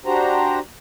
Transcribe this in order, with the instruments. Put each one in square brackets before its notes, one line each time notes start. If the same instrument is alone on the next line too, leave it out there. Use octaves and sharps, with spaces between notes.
[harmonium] D4 F#4 G4 C5 A#5